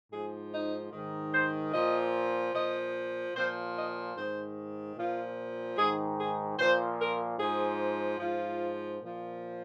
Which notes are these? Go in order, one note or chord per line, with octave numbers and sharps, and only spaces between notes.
G#2 F3 G#4
D#4
G#2 D#3
C5
A#2 F3 D#5
A#2 F3 D#5
A#2 F3 C5
D#5
G#2 D#3 C5
A#2 F3 F4
G#2 D#3 G#4
G#4
A#2 F3 C5
A#4
G#2 F3 G#4
G#2 F3 F4
A#2 F3